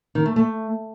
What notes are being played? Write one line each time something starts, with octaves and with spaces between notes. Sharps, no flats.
D#3
A3
A3